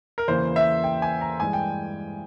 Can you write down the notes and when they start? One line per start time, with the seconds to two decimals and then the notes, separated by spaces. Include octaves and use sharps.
0.18 A#4
0.28 E2 C#3 E3 A#3 C5
0.56 E5
0.84 G5
1.02 G#5
1.21 A#5
1.40 G2 E3 G#3 G#5
1.53 G5